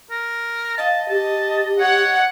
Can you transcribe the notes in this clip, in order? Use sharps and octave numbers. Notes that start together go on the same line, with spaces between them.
A#4
D#5 F5 A5
G4 A5
C#5 F#5